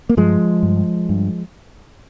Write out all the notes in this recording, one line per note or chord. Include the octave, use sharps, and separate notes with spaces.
A#3
G2 F3 G#3
G2
G2